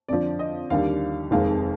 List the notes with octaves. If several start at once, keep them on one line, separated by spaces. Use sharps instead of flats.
F2 D3 F3 D5
D#5
D#2 D3 G3 F5
F1 F2 C3 D#3 G#3 F5